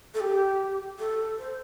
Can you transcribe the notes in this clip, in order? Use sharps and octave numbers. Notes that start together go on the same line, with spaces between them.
A4
G4
A4
C5